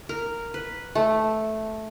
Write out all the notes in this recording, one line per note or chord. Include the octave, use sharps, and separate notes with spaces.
A#4
B4
A3